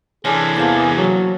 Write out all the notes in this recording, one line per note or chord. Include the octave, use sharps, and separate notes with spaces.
C3 E3 C#4 D4 G#4 A4
E2 A#3 C5 A5
F#3